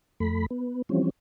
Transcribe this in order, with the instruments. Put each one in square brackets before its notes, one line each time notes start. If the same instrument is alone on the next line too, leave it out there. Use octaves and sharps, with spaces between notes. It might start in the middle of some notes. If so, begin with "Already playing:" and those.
[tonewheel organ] F2 A3 B5
B3
E3 F3 G3 C4 C#4